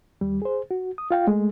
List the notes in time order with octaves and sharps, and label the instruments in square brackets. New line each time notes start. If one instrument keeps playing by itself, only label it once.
[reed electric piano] D#2 G3
G#4 C5
F#4
D#6
F4 F5 G5
G#3 A3